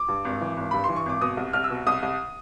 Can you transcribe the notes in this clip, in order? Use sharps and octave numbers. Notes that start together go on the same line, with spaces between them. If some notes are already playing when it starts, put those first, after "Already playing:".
Already playing: D6
G2
G#1
E3
G#1
G2 B5
E3 C6
C#6
G#1 D6
B2 D#6
C2
C2 F6
E6
B2
C2 D#6
C2